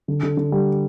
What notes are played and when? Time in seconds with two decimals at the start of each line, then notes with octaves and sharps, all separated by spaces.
0.08 D3
0.23 D3
0.37 D3
0.52 G3